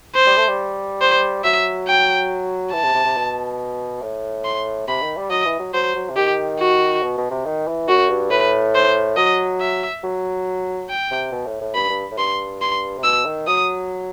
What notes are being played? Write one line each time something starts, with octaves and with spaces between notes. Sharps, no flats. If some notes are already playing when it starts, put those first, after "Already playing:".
C5
G3
A3
G3
C5
F#3 E5
G5
E3 A5
C3
C3
C3
B2
A2
C6
C3 B5
D#3
G3
F#3 D#5
E3
F#3
F#3 C5
F#3
C3
D#3 G4
F#4
B2
B2
C3
D#3
E3
F#2 F#4
G2
A2 B4
C5
F#3 D#5
E5
F#3
G5
C3
B2
A2
A2
G2 B5
G2
A2
G2 C6
C6
C3
B2 E6
D#3
F#3 D#6